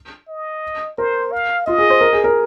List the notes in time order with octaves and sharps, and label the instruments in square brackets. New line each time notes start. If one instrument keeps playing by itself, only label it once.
[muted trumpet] D#5
[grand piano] A#4 [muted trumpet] C5
[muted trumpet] F5
[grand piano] F4 [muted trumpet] D#5
[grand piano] G#4
C5
A#4
G#4
A#4